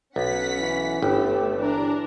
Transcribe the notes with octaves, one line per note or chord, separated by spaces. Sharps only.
B1 C#4 F#5 B6
E3
G1 A3 G4
E3 D4 A#4